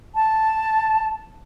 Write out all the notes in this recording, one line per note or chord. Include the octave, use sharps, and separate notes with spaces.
A5